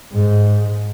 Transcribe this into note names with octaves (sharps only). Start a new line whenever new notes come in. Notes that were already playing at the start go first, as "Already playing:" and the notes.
G#2